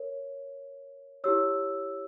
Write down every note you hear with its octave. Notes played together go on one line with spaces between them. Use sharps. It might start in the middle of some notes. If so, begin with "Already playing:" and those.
Already playing: A#4 C#5
E4 G4 C#5 E6